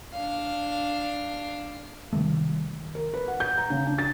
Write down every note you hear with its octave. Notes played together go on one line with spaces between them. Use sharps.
D4 F5
C3 D#3 G3 A3
A#4
B4
F#5
G6
A#5
C#3
D4
A6